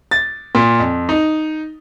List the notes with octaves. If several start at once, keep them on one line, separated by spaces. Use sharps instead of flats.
A6
A#2
F2
D#4